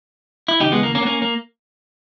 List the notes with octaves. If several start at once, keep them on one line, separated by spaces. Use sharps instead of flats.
E4
D#2 C#3 E3 D#4 G4
G#3 B3
A#3
A#3 C#4
B3
A#3 C#4
A#3